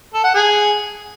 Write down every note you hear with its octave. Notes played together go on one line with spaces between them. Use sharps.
A4
F#5
G#4